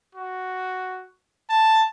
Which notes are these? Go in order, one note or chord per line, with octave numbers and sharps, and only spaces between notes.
F#4
A5